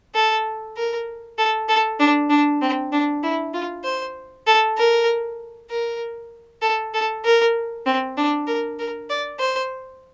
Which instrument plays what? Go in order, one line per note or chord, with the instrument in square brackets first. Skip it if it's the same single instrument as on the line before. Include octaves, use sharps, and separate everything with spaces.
[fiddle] A4
A#4
A4
A4
D4
D4
C4
D4
E4
F4
C5
A4
A#4
A#4
A4
A4
A#4
C4
D4
A#4
A#4
D5
C5